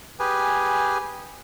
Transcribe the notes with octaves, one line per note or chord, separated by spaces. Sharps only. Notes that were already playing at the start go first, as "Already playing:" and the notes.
G4 G#4 B4 G#5